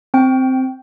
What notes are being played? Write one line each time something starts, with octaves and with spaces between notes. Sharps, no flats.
C4 G5